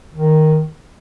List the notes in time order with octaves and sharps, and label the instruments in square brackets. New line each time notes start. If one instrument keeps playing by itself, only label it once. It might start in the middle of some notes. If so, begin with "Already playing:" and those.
[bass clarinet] D#3